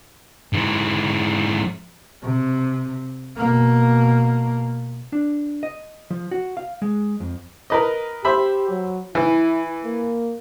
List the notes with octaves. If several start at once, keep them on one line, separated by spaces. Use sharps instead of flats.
G#2 E3
C3
B2 A#3
D4
D#5
F3
F#4
F5
G#3
F2
A#4 B4 D#5
G4 C5 E5 B5
F#3
E3 E4
A#3